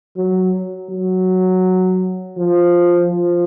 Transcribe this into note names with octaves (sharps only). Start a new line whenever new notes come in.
F#3
F#3
F3
F3